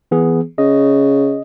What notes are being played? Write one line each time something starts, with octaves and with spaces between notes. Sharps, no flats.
E3 B3 G#4
C#3 D#5